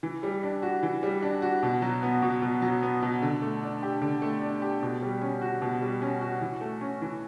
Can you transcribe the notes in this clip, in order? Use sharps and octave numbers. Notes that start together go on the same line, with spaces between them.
E3
G3
D4
F#4
E3
G3
D4
F#4
B2
F#3
B3
B2
B2
F#3
B3
B2
D3
A3
D4
G4
D3
A3
D4
G4
B2
G3
C#4
F#4
B2
G3
C#4
F#4
E3
A3
C#4
E3